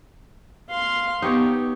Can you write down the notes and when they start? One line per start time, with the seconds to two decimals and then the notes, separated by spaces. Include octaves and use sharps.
0.70 F5 C6
1.22 B3 D#4 G4 C#5